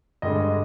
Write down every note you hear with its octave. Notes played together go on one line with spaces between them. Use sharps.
G2 D3 G#3 D#5